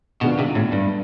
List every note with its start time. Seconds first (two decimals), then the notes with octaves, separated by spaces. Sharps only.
0.21 B2 D#3 G#3 B3 D4 F4
0.39 C3
0.55 A2
0.72 G2